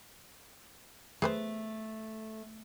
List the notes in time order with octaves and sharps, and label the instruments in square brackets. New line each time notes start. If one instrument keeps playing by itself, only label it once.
[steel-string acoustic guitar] A3 [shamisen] G#4 B4 C5